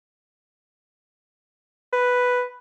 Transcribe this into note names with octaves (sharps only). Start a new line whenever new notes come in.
B4